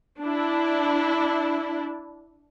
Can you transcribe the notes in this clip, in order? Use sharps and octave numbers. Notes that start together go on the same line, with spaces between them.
D4 E4